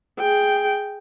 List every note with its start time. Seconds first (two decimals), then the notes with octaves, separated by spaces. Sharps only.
0.19 G#4 G5